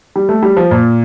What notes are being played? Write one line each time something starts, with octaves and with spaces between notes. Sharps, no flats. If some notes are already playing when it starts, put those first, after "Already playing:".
G3
A3
G3
F3
A#2